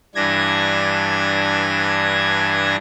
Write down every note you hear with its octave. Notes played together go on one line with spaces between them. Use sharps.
G2 E3 D4 G#6 A#6